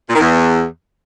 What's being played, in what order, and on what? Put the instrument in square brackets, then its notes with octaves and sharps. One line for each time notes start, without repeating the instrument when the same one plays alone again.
[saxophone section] A#2
D#3
E2